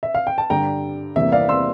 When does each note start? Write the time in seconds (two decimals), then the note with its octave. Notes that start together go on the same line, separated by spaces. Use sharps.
0.03 E5
0.15 F5
0.27 G5
0.38 A5
0.50 G2 D3 G3 D4 G5 A#5
1.16 E2 C3 E3 G3 A#3 E5
1.32 D5 F5
1.49 C6 E6